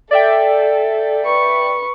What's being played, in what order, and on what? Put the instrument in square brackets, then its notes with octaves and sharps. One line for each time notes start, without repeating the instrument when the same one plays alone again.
[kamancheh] A4 [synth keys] D5 E5 G5
[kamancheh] B4 C#6